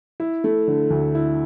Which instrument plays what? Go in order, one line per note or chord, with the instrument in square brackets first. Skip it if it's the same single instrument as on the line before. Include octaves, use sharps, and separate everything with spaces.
[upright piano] E4
A3
D3
D2
E4